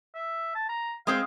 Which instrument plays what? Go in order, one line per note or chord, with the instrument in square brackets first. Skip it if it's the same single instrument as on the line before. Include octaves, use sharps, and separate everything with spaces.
[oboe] E5
A5
A#5
[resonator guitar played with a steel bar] G#3 C4 C5 [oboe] F5